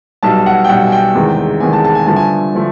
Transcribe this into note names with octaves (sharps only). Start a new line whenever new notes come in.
B1 B2 G3 A5
F#5
G5
B1 B2 G3 F#5
G#5
G5
E2 C3 D#3 G#3
E2 C3 D#3 G#3 G#5
A5
A5
G#5
G2 D3 F3 A3 A5
G#5
D3 F3 A3